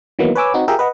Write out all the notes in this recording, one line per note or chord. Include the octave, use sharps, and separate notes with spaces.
D#3 E3 F#3 A#3 B3 D#4
B4 C#5 G#5 D6 E6
C4 D#4 F#4
F4 G4 G#4 A#4 E5 G5
B4 D#5 F#5